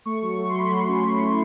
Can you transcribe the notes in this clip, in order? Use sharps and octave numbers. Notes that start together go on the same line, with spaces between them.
A3 C#6
F#3
A3 C#6
C6
F#3 B5
F#3 C6
C#4
F#3
E4